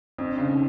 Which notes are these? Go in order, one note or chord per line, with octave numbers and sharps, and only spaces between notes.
F2 C4 D4
C#3
C#4 D#4